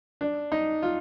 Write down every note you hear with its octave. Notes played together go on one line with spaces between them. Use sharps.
D4
D#4
F4